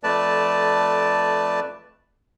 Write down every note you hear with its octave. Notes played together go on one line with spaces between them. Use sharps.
F2 A3 B4 D5 A5